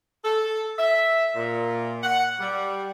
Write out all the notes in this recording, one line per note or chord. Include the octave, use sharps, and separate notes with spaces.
A4
E5
A#2
F#5
G3